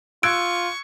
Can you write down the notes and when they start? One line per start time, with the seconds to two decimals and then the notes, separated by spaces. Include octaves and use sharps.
0.23 F4 C#6 E6 F#6 G#6 D7